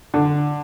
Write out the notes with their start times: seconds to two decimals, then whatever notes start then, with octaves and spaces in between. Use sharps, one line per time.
0.14 D3